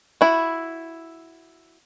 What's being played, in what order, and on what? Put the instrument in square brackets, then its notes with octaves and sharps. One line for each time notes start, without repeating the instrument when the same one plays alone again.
[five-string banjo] E4 F#4